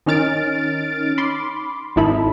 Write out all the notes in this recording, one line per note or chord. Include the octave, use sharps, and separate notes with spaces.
D#3 C#4 D#4 F6 A6 D7
B5 C6 D6
G#1 G#2 D#4 E4 A4 B5